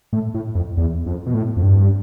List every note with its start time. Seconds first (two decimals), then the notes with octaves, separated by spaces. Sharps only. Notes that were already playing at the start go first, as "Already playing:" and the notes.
0.13 A2
0.34 A2
0.55 F2
0.77 E2
1.06 F2
1.26 B2
1.34 A2
1.57 F2
1.63 G2